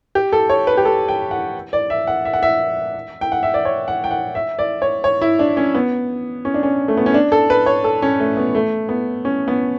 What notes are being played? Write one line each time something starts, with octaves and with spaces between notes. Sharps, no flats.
G4
A4
C#5
B4
G4
A4
G5
F#5
D5
E5
F#5
E5
F#5
E5
G5
F#5
E5
D5
C#5
F#5
G5
F#5
E5
D5
C#5
C#5
E4
D4
C#4
B3
C#4
D4
C#4
A3
B3
C#4
D4
A4
B4
C#5
A4
C#4
A3
B3
A3
B3
C#4
B3